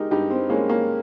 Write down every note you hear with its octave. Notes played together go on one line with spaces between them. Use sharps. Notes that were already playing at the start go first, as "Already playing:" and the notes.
Already playing: G#3 D#4 G4 A#4
G2 D#4 G4
C4
G#3 A#3 C#4
A#3 C#4